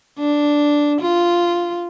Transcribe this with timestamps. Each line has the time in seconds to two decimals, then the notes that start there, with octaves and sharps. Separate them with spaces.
0.19 D4
1.01 F4